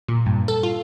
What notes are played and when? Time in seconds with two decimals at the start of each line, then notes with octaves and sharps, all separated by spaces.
0.08 A#2
0.26 G2
0.48 A4
0.63 F4